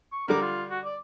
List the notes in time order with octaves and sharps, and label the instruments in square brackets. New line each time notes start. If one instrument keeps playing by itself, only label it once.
[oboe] C#6
[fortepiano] D3 G3 D6 [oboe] A#4
[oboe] F4
F#4
D5